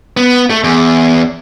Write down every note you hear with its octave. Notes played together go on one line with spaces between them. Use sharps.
B3
A3
E2